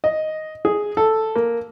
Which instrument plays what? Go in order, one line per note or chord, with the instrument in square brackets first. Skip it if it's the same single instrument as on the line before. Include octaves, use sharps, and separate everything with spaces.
[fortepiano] D#5
G#4
A4
A#3